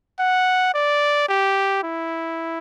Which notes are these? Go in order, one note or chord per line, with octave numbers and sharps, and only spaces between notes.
F#5
D5
G4
E4